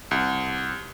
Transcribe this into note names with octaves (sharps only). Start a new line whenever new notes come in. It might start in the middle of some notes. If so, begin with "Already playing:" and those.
C2